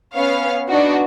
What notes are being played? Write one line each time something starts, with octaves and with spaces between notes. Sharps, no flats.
B3 C#4 C#5 F5
B3 D4 D#4 F#4